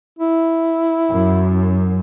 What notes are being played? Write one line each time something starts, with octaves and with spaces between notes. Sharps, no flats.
E4
F#2